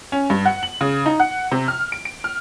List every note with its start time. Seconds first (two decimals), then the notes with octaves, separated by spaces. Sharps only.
0.12 C#4
0.30 G2
0.45 F#5
0.63 F#7
0.81 C#3
1.06 D#4
1.20 F#5
1.52 C3
1.68 F6
1.92 D7
2.05 D7
2.24 F6